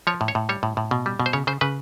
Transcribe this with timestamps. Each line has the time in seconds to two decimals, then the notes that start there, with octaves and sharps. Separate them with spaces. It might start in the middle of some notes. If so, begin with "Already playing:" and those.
0.07 F3 C#5
0.21 A2
0.28 C#5
0.35 A2
0.49 G3 C#5
0.63 A2
0.77 A2
0.91 B2
1.06 G3
1.20 B2
1.26 C5
1.33 C#3 C#5
1.47 C#3 C5
1.61 C#3 B4